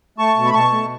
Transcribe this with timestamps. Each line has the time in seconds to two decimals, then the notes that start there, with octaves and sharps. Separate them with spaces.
0.18 A3 A5 C#6
0.37 B2
0.45 B5
0.54 B2 A5 C#6
0.72 A3